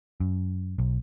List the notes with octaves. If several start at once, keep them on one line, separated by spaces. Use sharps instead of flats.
F#2
B1